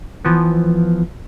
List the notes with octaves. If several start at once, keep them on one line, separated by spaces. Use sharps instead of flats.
E3 F3 B3